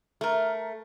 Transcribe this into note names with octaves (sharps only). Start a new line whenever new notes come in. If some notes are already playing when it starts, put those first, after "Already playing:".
A3 A#4